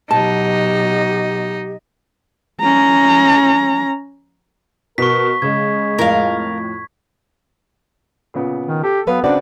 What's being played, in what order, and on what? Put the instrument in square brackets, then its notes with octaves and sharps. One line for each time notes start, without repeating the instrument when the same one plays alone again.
[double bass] B2 F#3 [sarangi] D#4 [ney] G4 [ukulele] A5
[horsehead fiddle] C#4 A#5
[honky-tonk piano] B2 [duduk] A#4 [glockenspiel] C#6 B6
[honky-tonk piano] C#3 [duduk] G#3 [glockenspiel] G#6
[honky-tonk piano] F2 A2 [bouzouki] A#4 F5
[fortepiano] A#2 C#3 B3
[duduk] D#3
[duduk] G4 [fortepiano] A4
[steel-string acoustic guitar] F#3 B4 F5 [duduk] B3
[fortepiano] C#3 C4 F#4 [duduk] D4 [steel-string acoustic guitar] B4 D5